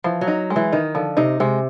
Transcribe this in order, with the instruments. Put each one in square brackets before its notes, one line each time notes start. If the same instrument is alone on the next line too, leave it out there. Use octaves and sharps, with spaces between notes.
[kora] E3 [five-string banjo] F3
[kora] F#3
[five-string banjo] D#4
G#3
[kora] E3
[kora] D#3 [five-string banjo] D#4
[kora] D3 [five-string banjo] F3
[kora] C3 [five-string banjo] D#4
[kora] C3 [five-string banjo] G#3